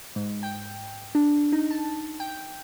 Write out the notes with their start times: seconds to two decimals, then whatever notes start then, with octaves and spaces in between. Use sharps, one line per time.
0.16 G#2
0.43 G5
1.15 D4
1.52 D#4
1.71 A5
2.20 G5